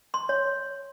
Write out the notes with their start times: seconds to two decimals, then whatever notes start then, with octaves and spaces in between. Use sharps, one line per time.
0.14 C6
0.29 C#5